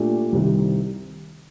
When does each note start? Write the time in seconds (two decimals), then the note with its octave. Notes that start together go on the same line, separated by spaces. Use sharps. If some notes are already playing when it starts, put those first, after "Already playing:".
Already playing: A#2 A3 D4 G4
0.32 C2 C3 D#3